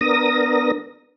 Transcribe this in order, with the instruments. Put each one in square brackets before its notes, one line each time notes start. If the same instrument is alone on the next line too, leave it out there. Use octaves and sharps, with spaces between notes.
[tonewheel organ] B3 D4 A#4 D#6 A#6